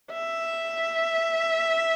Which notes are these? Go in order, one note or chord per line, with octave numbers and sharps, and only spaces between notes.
E5